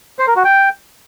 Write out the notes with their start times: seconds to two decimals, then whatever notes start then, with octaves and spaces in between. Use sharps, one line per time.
0.19 C5
0.27 A#4
0.36 F#4
0.44 G5